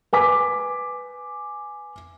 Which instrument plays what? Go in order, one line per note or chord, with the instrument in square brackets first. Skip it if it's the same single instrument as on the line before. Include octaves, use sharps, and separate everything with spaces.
[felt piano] B4 G#5 D6 B6